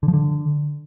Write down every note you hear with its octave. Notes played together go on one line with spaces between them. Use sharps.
D3
F3
D3